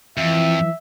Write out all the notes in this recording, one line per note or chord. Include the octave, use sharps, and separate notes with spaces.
F2 E3 E5